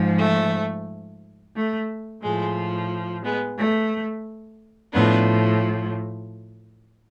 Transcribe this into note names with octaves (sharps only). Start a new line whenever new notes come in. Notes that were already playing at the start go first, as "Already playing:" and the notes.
Already playing: G#2 F3
A3
A3
A2 F3 G#3
G#3 B3
A3
A2 F3 B3 D4